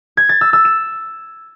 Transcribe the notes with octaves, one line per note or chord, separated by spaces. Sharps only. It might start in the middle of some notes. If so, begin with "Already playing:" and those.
G#6
A6
E6
E6
E7